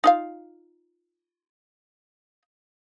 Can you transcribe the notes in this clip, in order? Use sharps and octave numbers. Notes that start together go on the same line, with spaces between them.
D#4 F4 F5